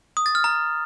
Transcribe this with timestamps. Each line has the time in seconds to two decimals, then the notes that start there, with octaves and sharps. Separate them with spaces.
0.17 D#6
0.26 A6
0.35 F6
0.44 A#5